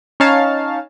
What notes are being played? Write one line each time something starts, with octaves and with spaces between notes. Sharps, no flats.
C#4 D#4 C#5 F5 A5